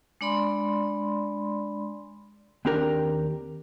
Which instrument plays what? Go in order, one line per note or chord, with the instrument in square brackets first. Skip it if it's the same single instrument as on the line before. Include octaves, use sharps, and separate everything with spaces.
[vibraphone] G#3 D4 D5 B5 C6
[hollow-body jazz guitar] D#2 C4 D4 G4 A#4 G5